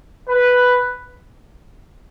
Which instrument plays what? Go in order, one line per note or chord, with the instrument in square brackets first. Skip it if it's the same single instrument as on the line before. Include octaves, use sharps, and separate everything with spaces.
[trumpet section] B4